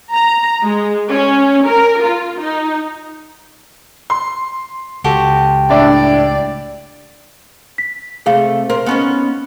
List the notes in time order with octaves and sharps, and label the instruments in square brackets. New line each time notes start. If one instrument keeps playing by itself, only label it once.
[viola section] A#5
G#3
C#4
A#4
F4
D#4
[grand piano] C6
[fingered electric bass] C#2 [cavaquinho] F#4 G4 A4
[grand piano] A2 D4 E4 [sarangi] D5
[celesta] B6
[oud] C3 A3 [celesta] G#4 F5
[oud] A#4 C5
B3 C#4 D#4